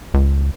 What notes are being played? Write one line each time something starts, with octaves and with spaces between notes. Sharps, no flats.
C#2